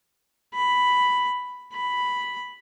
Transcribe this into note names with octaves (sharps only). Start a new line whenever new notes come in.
B5
B5